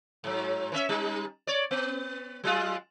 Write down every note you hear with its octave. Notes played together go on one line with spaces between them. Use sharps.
G#2 F#3
E3 C#4 E5
G3 D#4
C#5 D5
B3
F#3 G#3 F4